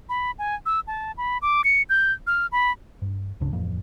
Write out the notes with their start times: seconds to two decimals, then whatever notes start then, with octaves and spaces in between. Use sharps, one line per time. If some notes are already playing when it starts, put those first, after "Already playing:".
0.09 B5
0.39 G#5
0.66 E6
0.87 A5
1.18 B5
1.42 D6
1.64 C#7
1.90 G6
2.27 F6
2.52 B5
3.02 G2
3.40 C#2 G2 C#3 D4
3.53 D1 A1 F2 A#3